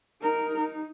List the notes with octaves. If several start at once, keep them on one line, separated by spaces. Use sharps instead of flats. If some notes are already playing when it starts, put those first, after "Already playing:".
D#4 A#4
D#4